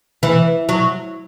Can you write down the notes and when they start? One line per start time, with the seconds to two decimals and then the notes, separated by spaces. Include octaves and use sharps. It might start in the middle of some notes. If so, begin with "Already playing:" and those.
0.23 E3
0.69 F#3